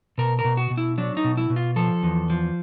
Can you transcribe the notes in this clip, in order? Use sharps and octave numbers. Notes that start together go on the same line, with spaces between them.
B2 A#4
A#4
B2
F#4
B2
E4
F#3 D4
D#4
B2
E4
B2
F4
F3 A4
E2
F3